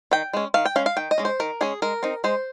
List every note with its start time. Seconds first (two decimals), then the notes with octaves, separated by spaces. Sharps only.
0.11 D#3 G5
0.33 G#3 C#4
0.54 D#3 F5
0.65 G5
0.76 C#4 F5
0.79 G#3
0.86 F5
0.97 D#3 G5
1.11 D#5
1.18 G#3 C#4
1.25 C5
1.40 D#3 A#4
1.61 G#3 C#4 G#4
1.82 G#3 A#4
2.03 C4 D#4
2.24 G#3 C5